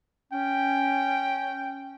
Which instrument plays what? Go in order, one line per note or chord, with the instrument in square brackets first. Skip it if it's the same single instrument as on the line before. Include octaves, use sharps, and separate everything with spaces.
[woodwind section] C#4 [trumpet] G5